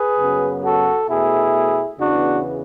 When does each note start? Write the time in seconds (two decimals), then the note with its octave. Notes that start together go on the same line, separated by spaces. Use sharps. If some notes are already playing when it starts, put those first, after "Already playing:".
Already playing: G#4 B4
0.19 F#2 C#3 F#3 B3
0.64 F#4 A4
1.09 B2 A3 E4 G#4
1.98 E2 C#3 E3 B3 D4 F#4